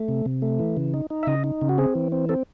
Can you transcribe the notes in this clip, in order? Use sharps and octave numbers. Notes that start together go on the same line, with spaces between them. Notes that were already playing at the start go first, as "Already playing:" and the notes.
Already playing: A3
C3
C3
A3
E3
C#3
D#4
D#4
E5
C#3 D#5
D#4
C#3
F#4
C4 G#4
E3
C4
C4 A4